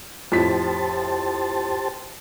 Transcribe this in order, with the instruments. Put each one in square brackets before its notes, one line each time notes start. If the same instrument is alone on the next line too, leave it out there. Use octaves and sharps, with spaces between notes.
[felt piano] F2 A2 B6 [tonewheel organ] G4 C5 A5